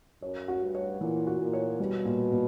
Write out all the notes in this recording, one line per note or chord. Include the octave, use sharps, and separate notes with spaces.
F#2 C#5
F#4
G2
C#5
A#2 E3
F#4
A#2
C#5
B2 G3
A#2
A#2